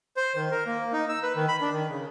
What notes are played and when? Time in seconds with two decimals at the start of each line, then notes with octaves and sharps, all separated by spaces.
0.17 C5
0.36 D#3
0.51 A#4
0.66 A#3
0.93 D#4
1.09 E6
1.23 B4
1.36 D#3
1.48 B5
1.61 D4
1.73 D#3
1.89 C#3